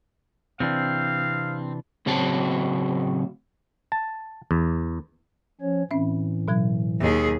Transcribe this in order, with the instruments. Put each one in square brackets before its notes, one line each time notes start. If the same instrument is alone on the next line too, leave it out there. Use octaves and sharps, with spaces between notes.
[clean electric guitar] C3 E3 D4 [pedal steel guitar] C4 [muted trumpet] F5
[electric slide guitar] A2 C#3 F#3 C4 F#4 A5
[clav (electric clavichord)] A5
E2
[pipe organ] F3 C#4 C#5
[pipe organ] A2 E3 [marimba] C4 C#4 E5
[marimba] B2 F#3 G#6
[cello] D#2 G#4